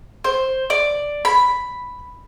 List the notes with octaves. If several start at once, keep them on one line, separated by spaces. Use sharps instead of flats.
C5
D5
B5